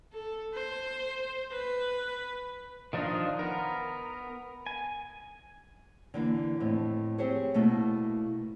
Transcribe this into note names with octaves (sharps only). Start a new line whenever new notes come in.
A4
C5
B4
D#3 F3 D4 D#4 F4
B3 A#4
G#5
D3 E3 A#3
F2 A2
C4 G4 G#4 C5 C#5
B2 A3 A#3 E4